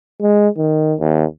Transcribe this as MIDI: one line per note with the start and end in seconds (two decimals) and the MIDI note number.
0.22 0.48 56
0.58 0.95 51
1.00 1.25 39